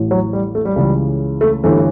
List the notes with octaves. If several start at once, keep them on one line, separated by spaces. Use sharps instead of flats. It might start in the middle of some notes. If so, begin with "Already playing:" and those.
Already playing: A1 A2
F#3
G3
A3
G3
C#2 C#3 E3 G3
A3
G1 G2 E3 A3